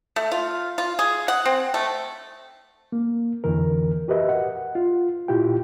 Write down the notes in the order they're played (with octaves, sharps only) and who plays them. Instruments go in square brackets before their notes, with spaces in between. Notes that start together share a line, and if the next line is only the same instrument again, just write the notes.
[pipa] A3
F4
F4
G#4
F#5
C4
A3
[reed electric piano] A#3
F2 D3 E3 A#4
F#4 G4 A#4 B4 D#5 E5
F#5
F4
A#2 E4 F4 G4 G5